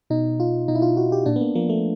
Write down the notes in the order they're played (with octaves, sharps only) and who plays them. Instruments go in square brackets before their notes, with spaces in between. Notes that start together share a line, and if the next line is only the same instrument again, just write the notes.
[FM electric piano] B2 D#4
F4
B2 D#4
E4
F4
F#4
G4
A#2 D4
B3
A#3
F3 A#3
A3